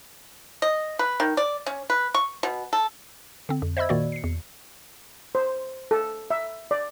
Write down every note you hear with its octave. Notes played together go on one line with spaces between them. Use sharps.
D#5
B4
D#3
D5
C#4
B4
C#6
B2
A4
D3 C4
F2
C5 D#5 E5 B5 E6 G#6
A#2 D#3 A#3 F#4 D5
C7 C#7
E2
C5
A4
E5
D5